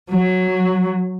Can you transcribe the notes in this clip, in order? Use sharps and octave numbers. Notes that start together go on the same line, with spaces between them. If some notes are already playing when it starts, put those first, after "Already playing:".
F#3